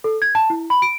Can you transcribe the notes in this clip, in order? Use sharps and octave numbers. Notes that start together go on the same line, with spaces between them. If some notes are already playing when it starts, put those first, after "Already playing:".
A4
G#6
A5
E4
B5
D7